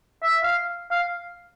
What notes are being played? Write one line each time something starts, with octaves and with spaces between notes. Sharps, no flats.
E5
F5
F5